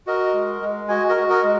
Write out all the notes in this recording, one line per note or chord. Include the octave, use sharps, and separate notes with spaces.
F#4 A#4 D#5
G#3
G#3
F#4 D#5 G#5
A#4 D#5
F#4
A#4 D#5
G#3